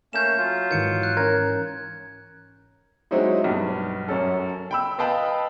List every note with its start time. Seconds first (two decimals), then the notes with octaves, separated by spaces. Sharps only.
0.13 A3 A#3 C#4 G6 E7
0.38 F#3 F4
0.71 G#2 D#3 E3 G6 C#7
1.03 F#6
1.17 C#4 A#4 G#6
3.11 F#3 G#3 C4 C#4 D#4 E4
3.44 B1 G2
4.08 F#2 C#4 A4
4.71 G5 B5 E6
4.98 B4 D#5 F5 G5 A5 B5